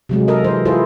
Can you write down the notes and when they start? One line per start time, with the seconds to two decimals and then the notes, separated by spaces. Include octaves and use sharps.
0.09 C3 F#3 G#3
0.28 A4 A#4 D#5
0.44 E3 C5
0.65 E4 F4 G#4 A4 C5